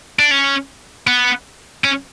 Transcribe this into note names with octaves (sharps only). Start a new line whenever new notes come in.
D4
C#4
B3
C#4